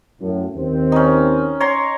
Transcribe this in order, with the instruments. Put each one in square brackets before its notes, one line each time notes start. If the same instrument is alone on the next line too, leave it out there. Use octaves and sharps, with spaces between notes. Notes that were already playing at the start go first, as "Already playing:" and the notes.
[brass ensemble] F#2 A2
D#2 C4
[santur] C#4 D#4
C#5 A#5 C6